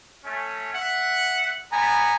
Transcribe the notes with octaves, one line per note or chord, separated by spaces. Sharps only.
A3 C#4
E5 F#5
G3 B3 G#5 A#5